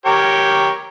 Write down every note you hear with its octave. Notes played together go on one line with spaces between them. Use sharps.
G4 A#4 C#5